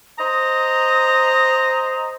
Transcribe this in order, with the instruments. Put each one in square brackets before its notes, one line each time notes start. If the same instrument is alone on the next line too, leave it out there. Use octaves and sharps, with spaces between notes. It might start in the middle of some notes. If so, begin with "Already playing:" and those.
[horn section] C5 D#5 A#5 [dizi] D#6